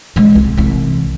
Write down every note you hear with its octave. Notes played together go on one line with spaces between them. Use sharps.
C#3 G#3
C2
C2 E3